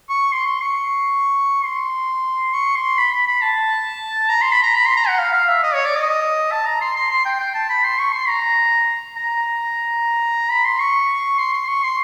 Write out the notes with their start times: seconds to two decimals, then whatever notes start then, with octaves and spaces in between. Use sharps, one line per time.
0.09 C#6
0.32 C6
0.46 C6
0.61 C#6
1.64 C6
2.53 C#6
2.75 C6
2.98 B5
3.12 B5
3.27 B5
3.42 A5
4.30 A#5
4.42 C6
4.52 B5
4.63 A#5
4.75 B5
4.85 C6
4.97 A#5
5.08 F#5
5.19 F5
5.33 F5
5.48 E5
5.63 D#5
5.74 C#5
5.85 D5
5.96 D#5
6.51 A5
6.66 A#5
6.81 C6
6.96 C6
7.11 C6
7.25 G5
7.40 G5
7.54 A5
7.70 B5
7.84 C6
7.99 C#6
8.14 C6
8.29 A#5
9.17 A#5
10.50 B5
10.65 C6
10.80 C#6
11.38 C6
11.53 C6
11.68 C#6
11.83 C6